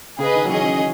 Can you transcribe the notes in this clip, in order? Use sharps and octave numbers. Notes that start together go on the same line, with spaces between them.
C#3 G#4 B4 D#5
D#3
F#3
E3 C#4 G#4 D#5
F#3